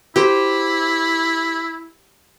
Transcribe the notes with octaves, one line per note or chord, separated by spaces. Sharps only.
E4 G4 C5